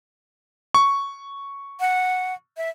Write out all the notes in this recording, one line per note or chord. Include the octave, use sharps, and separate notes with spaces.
C#6
F#5
E5